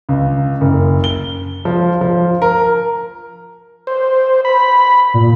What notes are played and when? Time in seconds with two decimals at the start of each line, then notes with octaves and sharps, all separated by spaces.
0.09 C#2
0.61 F#1
1.04 G7
1.65 F3
2.01 F3
2.42 A#4
3.87 C5
4.45 B5
5.14 A#2